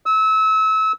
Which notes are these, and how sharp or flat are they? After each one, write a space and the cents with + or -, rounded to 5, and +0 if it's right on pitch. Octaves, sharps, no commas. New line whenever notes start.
E6 -30